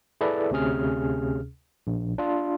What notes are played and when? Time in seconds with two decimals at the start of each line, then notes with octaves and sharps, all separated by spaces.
0.21 E4 G#4 A4 B4 D5 E5
0.51 D2 C3 C#4 G#4 F6
1.87 A#1
2.18 D4 F4